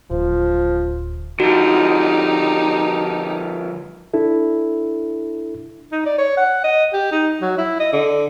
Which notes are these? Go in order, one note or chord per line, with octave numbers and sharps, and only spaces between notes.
D1 F3
D3 F3 D#4 F#4 G4
D4 E4 A4
D#4
D5
C#5
F#5
D#5
G4
D#4
F#3
E4
D#5
D3